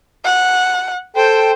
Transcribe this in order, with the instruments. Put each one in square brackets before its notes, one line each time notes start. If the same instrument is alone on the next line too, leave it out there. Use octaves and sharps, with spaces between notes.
[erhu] F#5
[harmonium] A4 G5 [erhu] C5